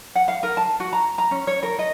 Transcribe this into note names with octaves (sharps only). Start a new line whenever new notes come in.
F#5
F5
A#4
A5
F#4
A#5
A#5
C#4
C#5
A#4
D#5